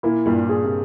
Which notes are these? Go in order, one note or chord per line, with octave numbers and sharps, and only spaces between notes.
A#2 A#3 E4
G2 A#2 G3
G#4
C3